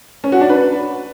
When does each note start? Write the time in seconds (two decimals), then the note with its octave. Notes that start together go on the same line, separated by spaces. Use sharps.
0.24 C#4
0.32 F#4
0.41 D4
0.49 B4